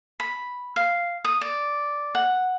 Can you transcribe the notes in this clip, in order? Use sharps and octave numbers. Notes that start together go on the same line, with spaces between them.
B5
F5
D#6
D5
F#5